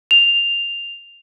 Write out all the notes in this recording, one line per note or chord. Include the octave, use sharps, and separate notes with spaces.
F7